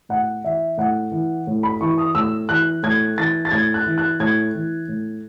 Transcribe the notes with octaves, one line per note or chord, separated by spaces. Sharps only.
A2 F#5
E3 E5
A2 F#5
E3
A2
B5
E3 C#6
D#6
A2 E6
E3 F#6
A2 G#6
E3 A6
A6
A2 G#6
F#6
E3
F#6
A2 G#6
E3
A2